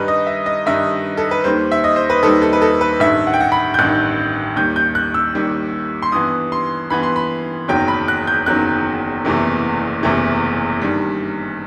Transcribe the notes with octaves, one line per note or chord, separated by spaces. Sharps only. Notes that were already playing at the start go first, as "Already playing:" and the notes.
Already playing: G2 D#3 G3 D#4 B4
D#5
E5
D#5
G2 D#3 G3 D#4 E5
A4
B4
D#2 D#3 G3 C5
E5
D#5
C5
B4
D#2 D#3 G3 A4
A4
B4
A4
B4
A1 G2 D#3 E5
F#5
G5
F#5
B5
G6
A1 G2 D#3 F#6
D#2 D#3 G3 G6
G6
F#6
E6
D#2 D#3 G3
C6
G2 E3 B3 D#6
C6
G2 E3 B3 B5
C6
B5
F#1 E2 D#3 F#3 G5
B5
F#6
G6
F#1 E2 D#3 F#3 F#6
F#1 E2 C3 E3 A3
F#1 E2 C3 E3 A3
G2 D#3 G3